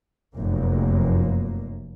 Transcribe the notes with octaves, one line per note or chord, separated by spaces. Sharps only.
F1 F#2 A#3